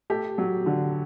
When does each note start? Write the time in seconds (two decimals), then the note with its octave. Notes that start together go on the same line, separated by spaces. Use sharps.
0.10 A3 G4
0.38 F#3
0.66 D3